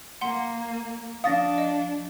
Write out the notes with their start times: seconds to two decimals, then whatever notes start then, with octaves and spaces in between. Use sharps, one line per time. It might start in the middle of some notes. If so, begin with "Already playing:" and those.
0.21 A#3 F#5 C6
1.24 F3 D4 F5 D#6 A6 A#6
1.58 D#5